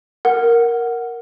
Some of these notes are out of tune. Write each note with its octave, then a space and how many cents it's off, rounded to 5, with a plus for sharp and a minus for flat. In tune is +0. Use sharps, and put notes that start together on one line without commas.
A#4 +0 F#5 +0